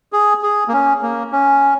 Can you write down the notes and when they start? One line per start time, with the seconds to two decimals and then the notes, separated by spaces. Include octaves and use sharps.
0.13 G#4
0.43 G#4
0.68 A#3
0.73 C#4
1.03 A#3
1.32 C#4